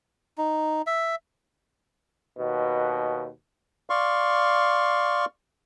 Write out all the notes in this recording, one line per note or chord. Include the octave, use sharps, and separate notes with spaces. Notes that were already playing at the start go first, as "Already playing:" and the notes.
D#4
E5
D#2 B2
D5 F5 C6 C#6